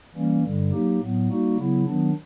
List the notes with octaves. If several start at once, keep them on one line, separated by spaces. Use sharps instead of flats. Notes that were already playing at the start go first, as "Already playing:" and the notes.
E3 G3 A#3 C#4
G2 D3 G3
F#3 A#3 D#4 G4
A2 F#3 B3
G3 A#3 D#4 F#4
C#3 F#3 B3 E4
D#3 F#3 B3 D4